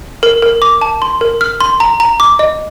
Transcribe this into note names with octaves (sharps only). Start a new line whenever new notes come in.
A#4
A#4
D6
A5
C6
A#4
F6
C6
A#5
A#5
D6
D#5